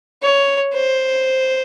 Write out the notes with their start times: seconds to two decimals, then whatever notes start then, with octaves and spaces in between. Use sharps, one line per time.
0.23 C#5
0.74 C5